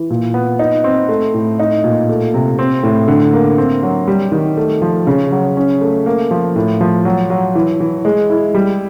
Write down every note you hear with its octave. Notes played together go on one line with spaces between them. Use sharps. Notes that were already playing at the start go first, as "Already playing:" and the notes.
Already playing: E3
A#2
B3
D#4
C4
A3
A2
D#4
A#2
A3
C3
C4
A2
D3
A#3
C4
F#3
G3
D#3
A3
F3
C#3
F#3
C#4
A3
A#3
F3
A2
F3
F#3
F#3
E3
E3
G#3
E4
G3